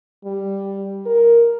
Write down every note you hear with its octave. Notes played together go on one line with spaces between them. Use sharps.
G3
A#4